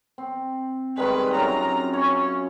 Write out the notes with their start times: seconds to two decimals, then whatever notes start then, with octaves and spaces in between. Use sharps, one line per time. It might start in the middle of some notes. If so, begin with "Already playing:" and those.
0.18 C4
0.97 D#3 G3 G#3 B4
1.34 F#2 C4 F4 A#5
1.93 C#4 C#5